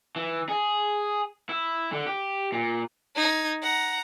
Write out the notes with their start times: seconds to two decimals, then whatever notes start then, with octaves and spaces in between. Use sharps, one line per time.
0.16 E3
0.49 G#4
1.49 E4
1.92 D3
2.07 G4
2.52 A#2
3.16 D#4 G#6
3.63 F#5 A#5